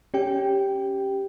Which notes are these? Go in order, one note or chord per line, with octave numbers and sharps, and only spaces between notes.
C#4 G4 G5